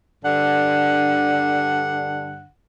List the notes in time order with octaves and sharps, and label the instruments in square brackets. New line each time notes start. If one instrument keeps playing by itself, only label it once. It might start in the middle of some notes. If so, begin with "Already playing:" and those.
[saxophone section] G2 D3 D4 F#5